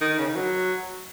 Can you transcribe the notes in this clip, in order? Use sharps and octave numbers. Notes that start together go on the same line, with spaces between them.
D#3
C#3
D#3
F#3